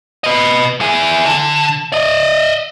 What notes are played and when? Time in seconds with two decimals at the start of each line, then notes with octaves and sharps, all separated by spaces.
0.24 B4 D#5
0.81 E4 G#4
1.26 D3
1.92 D5 D#5